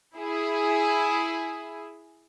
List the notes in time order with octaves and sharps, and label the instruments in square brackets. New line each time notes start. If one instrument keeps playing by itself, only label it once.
[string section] E4 G#4